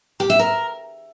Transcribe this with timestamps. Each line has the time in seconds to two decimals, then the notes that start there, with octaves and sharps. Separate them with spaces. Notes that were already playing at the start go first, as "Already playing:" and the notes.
0.20 G4
0.30 E5
0.39 A#4